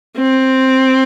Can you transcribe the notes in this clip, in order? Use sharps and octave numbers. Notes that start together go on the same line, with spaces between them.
C4